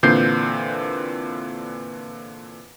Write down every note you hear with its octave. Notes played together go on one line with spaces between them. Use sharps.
A#2 D3 E3 C4 G6 C7